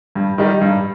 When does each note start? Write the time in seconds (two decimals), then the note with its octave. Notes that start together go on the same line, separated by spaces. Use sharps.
0.15 G2
0.38 D#3 G3 D#4
0.61 G2